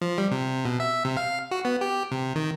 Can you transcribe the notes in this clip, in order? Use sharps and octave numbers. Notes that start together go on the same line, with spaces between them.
F3
G3
C3
B2
E5
C3
F5
F#4
B3
G4
C3
D#3